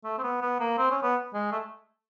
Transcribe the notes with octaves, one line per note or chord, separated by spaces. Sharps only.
A3
C4
B3
B3
A#3
C4
C#4
B3
G#3
A3